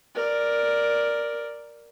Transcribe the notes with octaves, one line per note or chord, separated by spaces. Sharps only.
A#4 D5